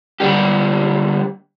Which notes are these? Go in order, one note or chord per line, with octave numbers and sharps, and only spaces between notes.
D3 G3 A#3 D4 G4